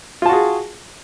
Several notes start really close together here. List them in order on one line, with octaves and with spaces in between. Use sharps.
F4 A5 F#4 G#4